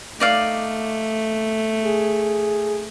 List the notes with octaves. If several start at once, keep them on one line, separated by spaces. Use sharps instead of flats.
A3 D#4 D5 F5
G#4